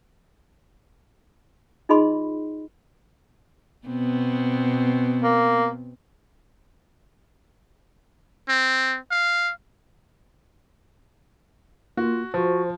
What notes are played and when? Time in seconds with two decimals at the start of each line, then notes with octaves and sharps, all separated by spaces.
1.89 D#4 F4 G#4 D#5 B5 C6
3.87 B2 B3 C4
5.23 A#3
8.48 C4
9.11 F5
11.97 A#3 F4 F#4
12.34 F3 F#4 C5